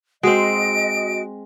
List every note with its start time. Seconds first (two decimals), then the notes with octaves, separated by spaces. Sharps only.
0.23 G#3 C4 F#4 D#5 D7